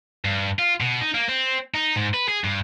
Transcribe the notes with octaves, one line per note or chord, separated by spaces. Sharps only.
G2
F4
B2
D#4
A#3
C4
D#4
G#2
B4
G#4
G2